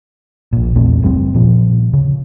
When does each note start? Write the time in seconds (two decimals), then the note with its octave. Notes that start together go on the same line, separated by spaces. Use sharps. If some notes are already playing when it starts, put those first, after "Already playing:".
0.53 A#1 A#2
0.76 E2 A#2 A3 C4
1.03 F#1 G3 C4
1.34 A#2 F3
1.93 C#3